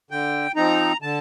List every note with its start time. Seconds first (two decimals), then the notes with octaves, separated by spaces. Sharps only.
0.11 D3 G5
0.56 F3 C4 D#4 A#5
1.02 D3 A5